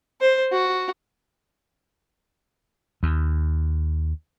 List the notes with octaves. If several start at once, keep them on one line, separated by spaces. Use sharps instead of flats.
C5
F#4
D#2